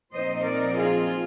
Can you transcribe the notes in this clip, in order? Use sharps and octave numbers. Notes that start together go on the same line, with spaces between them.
A#2 F3 C4 D#4 C5 D#5
A#4 D5
F4 G#4